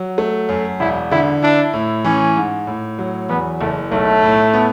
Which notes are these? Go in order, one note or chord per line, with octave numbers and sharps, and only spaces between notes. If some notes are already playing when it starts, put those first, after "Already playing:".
Already playing: F#3
A3
F#2
E1 E4
D3 E4
D4 E4
A2
E3 C#4
G#2
A2
F#3
E2 B3
F#1 A3
B1 A3
A2
B3